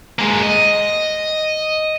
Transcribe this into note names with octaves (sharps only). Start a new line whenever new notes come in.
G#3 A#3
D#5